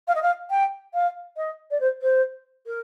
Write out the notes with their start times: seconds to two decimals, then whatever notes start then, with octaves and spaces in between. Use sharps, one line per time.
0.08 F5
0.15 D#5
0.22 F5
0.50 G5
0.94 F5
1.37 D#5
1.71 D5
1.80 C5
2.02 C5
2.67 A#4